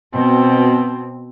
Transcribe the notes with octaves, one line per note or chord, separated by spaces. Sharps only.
B2 C4